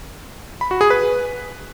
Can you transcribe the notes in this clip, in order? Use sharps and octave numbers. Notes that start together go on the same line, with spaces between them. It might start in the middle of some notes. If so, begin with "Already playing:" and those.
B5
F#4
G#4
B4